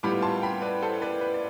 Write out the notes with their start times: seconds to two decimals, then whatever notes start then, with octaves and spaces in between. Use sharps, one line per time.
0.03 A2 G3 B3 F4 B5 D6
0.22 A5 C6
0.42 G5 B5
0.62 B4 D5
0.82 A4 C5
1.02 B4 D5
1.21 B4
1.34 D5